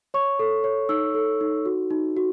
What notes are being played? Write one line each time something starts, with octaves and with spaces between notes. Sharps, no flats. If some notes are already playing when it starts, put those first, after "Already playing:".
C#5 C#6
A4
C#5
D#4 E6
A4
D#4
F#4
D#4
F#4